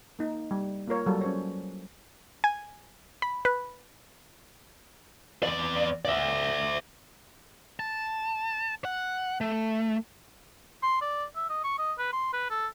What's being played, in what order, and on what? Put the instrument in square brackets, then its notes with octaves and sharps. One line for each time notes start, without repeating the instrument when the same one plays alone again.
[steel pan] A#3 D#4
G3
A#3 F4 A#4 C#5
F#3 G3 A4
C#4 C5 C#5
[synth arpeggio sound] G#5
B5
B4
[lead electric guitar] E2 D5
D5 E5
A5
F#5
A3
[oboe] C6
D5
E5
D#5
C#6
D#5
B4
C6
B4
A4